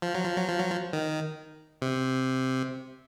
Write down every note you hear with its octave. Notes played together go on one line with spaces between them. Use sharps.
F3
F#3
F3
F#3
F3
F#3
F3
D#3
C3